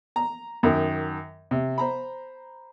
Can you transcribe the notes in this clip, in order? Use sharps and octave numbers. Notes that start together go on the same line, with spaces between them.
A#5
F#2 D#3
C3
C5 A#5 B5